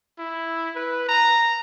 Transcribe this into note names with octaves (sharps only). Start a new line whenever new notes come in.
E4
B4
A#5